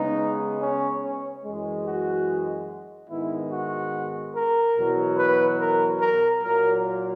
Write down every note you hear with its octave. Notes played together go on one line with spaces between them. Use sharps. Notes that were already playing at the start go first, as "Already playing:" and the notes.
Already playing: C#3 G#3 B3 D#4
C#4
C#4
F#2 E3 G#3
F#4
G#2 D#3 G#3 B3 E4
F#4
A#4
E2 B2 F#3
B4
A#4
A#4
A#2 F#3 A#3 A#4